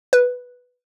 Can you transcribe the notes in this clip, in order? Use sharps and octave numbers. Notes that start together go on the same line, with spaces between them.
B4